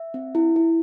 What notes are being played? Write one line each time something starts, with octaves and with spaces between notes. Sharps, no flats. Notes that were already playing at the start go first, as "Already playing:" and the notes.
Already playing: E5
C4
E4
E4